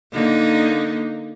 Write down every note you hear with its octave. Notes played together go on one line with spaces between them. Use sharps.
D3 A#3 D#4